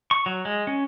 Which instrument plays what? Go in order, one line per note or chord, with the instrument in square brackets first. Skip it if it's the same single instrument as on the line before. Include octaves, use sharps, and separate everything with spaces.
[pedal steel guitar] C#6
F#3
G#3
C#4